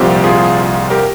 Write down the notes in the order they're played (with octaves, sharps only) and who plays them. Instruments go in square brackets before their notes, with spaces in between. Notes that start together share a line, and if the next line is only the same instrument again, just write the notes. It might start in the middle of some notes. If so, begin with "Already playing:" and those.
Already playing: [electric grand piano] C2 A#2 F3 C4 G4
F4 G#4
G4 A#4